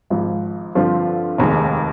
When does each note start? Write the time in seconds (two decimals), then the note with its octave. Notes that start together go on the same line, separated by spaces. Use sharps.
0.10 G#1 G#2 F3
0.75 G2 D3 F3 C4 F4
1.38 F1 D#2 D#3 G#3